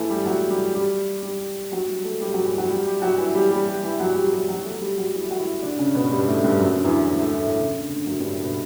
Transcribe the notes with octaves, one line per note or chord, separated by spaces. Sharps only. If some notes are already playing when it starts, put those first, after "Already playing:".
Already playing: E3 A3 E4 A4
G3 G4
F#3 F#4
G3 G4
G3 G4
G3 G4
F#3 F#4
G3 G4
A3 A4
G3 G4
F#3 F#4
E3 E4
F#3 F#4
G3 G4
G3 G4
F#3 F#4
E3 E4
G3 G4
G3 G4
G3 G4
E3 E4
F#3 F#4
G3 G4
G3 G4
F#3 F#4
A3 A4
G3 G4
F#3 F#4
E3 E4
F#4
E3 E4
D3 D4
C#3 C#4
B2 B3
G2 G3
A2 A3
G2 G3
F#2 F#3
D3
E2 E3
E2 E3
A2 A3
A2 A3
A2 A3
C#3
D3
D3
F#2 F#3
G2 G3
A2 A3
B2 B3